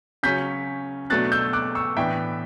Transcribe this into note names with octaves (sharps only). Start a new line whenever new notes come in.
C#3 F#3 C#4 G6 B6
B2 F#3 A3 D4 F#6 A6
E6 G6
D6 F#6
C#6 E6
A2 E3 B3 D4 E5 G5